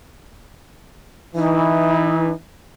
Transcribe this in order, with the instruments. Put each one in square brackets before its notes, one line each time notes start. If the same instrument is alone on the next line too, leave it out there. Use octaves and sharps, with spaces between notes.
[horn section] E3 [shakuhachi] D#4